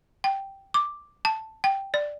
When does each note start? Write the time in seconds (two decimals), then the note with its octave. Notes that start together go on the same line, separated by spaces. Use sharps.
0.24 G5
0.74 D6
1.25 A5
1.64 G5
1.94 D5